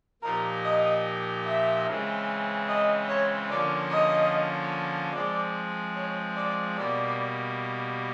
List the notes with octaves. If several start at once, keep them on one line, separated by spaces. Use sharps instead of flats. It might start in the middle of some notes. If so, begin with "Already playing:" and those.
A#2 F3 A#3 D#4 G4 A#4
D#5
E5
C#3 E3 G#3 C4
D#5
C#5
D3 F3 A#3 C#4 F4 D5
D#5
F3 G#3 C4 D5
C#5
D5
B2 G3 A#3 D5